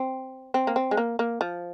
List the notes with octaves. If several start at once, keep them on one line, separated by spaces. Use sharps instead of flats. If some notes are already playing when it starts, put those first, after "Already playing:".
Already playing: C4
C4
A#3
C4
G#3
A#3
A#3
F3